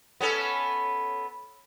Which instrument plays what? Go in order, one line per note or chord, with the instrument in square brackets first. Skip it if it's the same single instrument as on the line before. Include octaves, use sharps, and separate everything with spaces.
[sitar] B3 C#4 A4